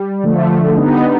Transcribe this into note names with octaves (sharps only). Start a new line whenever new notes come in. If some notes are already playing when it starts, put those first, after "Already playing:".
Already playing: G3
D3 F3 A3
D3 G3 B3 D#4